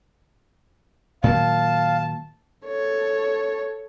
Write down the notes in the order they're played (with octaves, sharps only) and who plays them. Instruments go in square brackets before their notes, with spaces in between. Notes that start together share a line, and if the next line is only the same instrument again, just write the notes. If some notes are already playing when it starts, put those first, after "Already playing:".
[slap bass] A#2 D#3 F#3 [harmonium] F5 [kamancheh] A5
[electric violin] A4 C#5